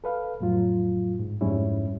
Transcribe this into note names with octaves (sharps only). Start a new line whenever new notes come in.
A4 B4 F5
F2 A2 F#3 F4
G#2
F2 G#2 G3 C#4 E4